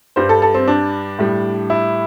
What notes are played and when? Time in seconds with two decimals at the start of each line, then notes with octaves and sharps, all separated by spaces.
0.16 G2 G3 C5
0.29 A4
0.42 A4
0.54 C4
0.68 D4
1.19 A2 G3
1.70 E4